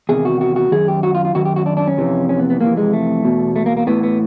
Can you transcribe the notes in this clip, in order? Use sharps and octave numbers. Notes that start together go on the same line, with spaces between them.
E2 C3 D#3 G#4
F#4
F#4
F#4
F#2 D#3 G#4
G4
F#4
F4
F4
F#2 D#3 F#4
G4
F#4
D4
D4
C#4
F2 C3 E3
C#4
B3
B3
F2 C3 E3 A#3
G#3
A3
E2 B2
A3
A#3
A#3
A2 E3 B3
B3